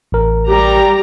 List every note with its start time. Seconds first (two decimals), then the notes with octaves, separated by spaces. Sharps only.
0.12 A1 A#4
0.47 G3 G4 A#5